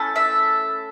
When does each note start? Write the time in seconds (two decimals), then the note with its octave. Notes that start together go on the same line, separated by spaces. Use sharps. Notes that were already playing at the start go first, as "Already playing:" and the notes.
Already playing: A3 C#4 E4 A4
0.16 E5